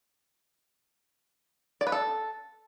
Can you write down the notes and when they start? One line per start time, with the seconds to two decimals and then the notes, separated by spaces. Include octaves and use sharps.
1.81 D5
1.87 B4
1.92 A4